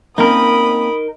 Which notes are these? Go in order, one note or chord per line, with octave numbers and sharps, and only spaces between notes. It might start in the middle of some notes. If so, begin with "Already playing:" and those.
A#3 C4 C#4 D#4 A#4 B5 D#6